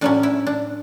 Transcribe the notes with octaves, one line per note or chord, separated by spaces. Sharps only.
A2 F#3 C#4 D4
E4
D4